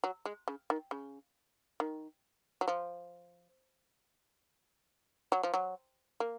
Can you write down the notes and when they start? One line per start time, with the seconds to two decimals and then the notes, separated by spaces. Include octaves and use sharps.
0.04 F#3
0.25 G#3
0.48 C#3
0.70 D#3
0.91 C#3
1.80 D#3
2.61 F#3
2.68 F3
5.32 F#3
5.43 F3
5.54 F#3
6.20 A#3